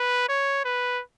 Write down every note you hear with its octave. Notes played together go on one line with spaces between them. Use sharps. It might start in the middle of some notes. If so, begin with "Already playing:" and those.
Already playing: B4
C#5
B4